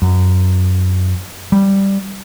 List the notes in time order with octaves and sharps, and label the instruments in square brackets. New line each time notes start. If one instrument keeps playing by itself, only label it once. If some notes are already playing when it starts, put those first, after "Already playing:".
[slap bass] F#2
G3